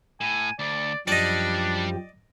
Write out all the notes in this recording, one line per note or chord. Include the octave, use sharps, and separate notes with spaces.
A2 G#5
D2 D5
F#2 F3 G3 D4 G4 D5 D#5